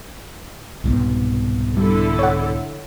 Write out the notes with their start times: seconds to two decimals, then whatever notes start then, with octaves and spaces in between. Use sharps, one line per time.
0.84 C2 G#2 B2
1.77 D3 G3 E4 A4
2.19 C#5 F#5